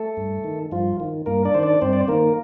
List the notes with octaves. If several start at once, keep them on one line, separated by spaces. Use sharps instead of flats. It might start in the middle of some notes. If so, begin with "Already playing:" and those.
Already playing: A3 A4
G2
D#3
G2 F3 F4
D#3
G2 A#3 A#4
D4 D5
D#3 C5
D4 D5
G2 C4 C5
D5
C5
D#3 A#3 A#4